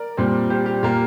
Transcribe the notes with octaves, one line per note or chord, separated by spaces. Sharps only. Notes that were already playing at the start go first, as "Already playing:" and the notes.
Already playing: A#4 D5
A#2 G3 C4
G4 C5
G4
A#2 A#3 G4